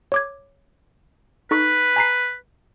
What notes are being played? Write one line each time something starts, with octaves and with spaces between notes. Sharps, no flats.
C#5 D6 G#6
D#4 A4 B4 C#6
G#5 A#5 C7